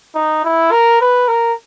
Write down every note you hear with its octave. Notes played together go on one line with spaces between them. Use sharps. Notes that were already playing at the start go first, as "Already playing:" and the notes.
D#4
E4
A#4
B4
A#4